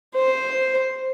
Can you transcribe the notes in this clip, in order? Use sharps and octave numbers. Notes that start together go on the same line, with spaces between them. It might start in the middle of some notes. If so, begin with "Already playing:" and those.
C5